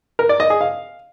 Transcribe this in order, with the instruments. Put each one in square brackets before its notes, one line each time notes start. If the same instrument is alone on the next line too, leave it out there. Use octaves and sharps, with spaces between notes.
[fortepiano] A#4
D5
D#5
G#4
F5